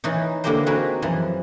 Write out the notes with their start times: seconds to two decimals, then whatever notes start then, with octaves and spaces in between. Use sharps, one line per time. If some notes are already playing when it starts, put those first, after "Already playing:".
0.04 E3 C#4 D#4
0.44 D3 A#3 E4 G4 A#4 C5
0.66 C4 D#4 F#4 G#4 A#4 B4
1.02 F#2 E3 F3